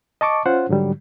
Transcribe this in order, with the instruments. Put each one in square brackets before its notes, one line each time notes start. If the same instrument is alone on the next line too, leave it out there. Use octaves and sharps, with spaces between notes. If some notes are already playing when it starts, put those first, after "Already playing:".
[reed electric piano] D#5 A5 C#6 D6
C#4 F4 C5 F#5
G#2 D3 F#3 G3